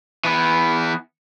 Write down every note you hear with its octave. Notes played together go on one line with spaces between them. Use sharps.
E3 B3